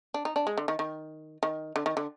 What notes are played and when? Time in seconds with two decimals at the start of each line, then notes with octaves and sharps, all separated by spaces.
0.14 D4
0.25 D#4
0.36 D4
0.47 G#3
0.58 D3
0.68 D#3
0.79 D#3
1.43 D#3
1.76 D3
1.86 D#3
1.97 D3